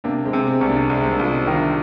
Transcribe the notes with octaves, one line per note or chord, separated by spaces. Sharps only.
C3 A#3 D4
G#3 C4
C3
G#3 C4
C2
A#3 D4
C2 G#3 C4
C4
A#3 D4
C2 F4
C4 D#4
D#3
D4 F4